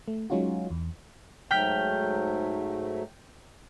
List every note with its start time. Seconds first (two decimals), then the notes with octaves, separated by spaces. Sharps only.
0.08 A3
0.30 F#3 G#3 C#4 D#4 F4 F#4
0.70 E2
1.51 G#2 F#3 A3 G5 F6 B6